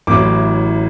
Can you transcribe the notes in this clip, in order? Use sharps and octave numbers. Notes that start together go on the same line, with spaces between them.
A1 A2 F#3 D6